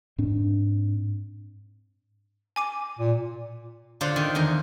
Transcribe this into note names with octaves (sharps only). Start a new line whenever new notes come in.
G#2 C4 D4
G#5 D6 D#7
A#2
D3 F4 C5 D5 F#5
D#3
E2 D3 A#4